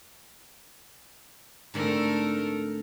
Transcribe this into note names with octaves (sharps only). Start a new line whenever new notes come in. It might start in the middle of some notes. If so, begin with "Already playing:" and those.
G#2 D3 A3 C4 A4 A#4